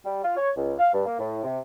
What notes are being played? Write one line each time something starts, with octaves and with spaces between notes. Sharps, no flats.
G3
F4
C#5
C#2
F5
G2
A#3
A2
C3